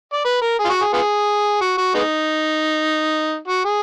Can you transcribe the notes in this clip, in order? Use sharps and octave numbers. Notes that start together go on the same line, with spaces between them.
D5
B4
A#4
G#4
F4
F#4
G#4
B3 F4 G#4
F#4
F#4
G#3 B3 D#4
F#4
G#4